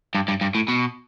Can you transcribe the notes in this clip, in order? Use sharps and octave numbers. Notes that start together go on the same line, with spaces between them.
G2
G2
G2
A2
B2